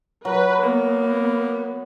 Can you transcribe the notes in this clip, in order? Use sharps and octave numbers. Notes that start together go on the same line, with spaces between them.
F#3 B4
A#3 B3